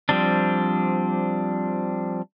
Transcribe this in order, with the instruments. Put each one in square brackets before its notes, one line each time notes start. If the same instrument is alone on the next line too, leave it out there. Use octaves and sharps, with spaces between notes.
[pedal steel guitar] F3 G3 C4 D4